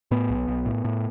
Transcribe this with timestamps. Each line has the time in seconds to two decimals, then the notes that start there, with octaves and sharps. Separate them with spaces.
0.11 A2 B3
0.30 B1
0.48 B1
0.66 A2
0.85 A2